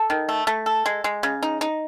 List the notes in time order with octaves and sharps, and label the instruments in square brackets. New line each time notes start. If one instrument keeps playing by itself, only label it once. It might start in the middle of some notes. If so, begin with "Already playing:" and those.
Already playing: [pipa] A4
D#3
A3
A3
A4
G#3
G#3
C#3
D#4
D#4